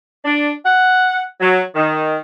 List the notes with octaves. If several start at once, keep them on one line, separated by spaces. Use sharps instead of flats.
D4
F#5
F#3
D#3